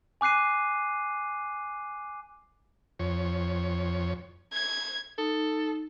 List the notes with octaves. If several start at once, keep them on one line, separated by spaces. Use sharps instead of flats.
G#5 D6 F#6 C7 D#7
F2 C#5
G#6
D#4 A4